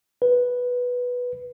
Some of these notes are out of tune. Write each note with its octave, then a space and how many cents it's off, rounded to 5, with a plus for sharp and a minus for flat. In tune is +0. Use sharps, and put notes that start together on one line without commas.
B4 -5